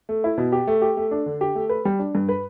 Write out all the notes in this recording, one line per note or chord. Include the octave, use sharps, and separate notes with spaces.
A3
E4
B2
G4
A3
G4
A3
D4
D3
G4
A3
B4
G3
D4
G2
B4